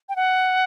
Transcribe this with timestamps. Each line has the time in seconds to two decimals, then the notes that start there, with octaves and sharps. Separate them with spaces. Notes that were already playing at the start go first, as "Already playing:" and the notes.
0.09 G5
0.16 F#5